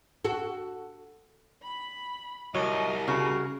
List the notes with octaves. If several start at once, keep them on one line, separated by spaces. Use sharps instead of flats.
F#4 A4
B5
C2 F#3 A#4 D#5
C#3 F#4